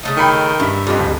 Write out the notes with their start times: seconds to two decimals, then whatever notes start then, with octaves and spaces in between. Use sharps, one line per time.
0.03 C#3 A3 D#4
0.18 D#3 G5 B5 C#7
0.60 G2 E5
0.87 F2 G3 D#4
0.99 D1